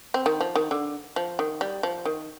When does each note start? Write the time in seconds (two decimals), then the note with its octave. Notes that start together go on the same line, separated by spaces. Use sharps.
0.14 C4
0.26 D#3
0.41 F3
0.55 D#3
0.71 D3
1.16 F3
1.39 D#3
1.61 G3
1.83 F3
2.05 D#3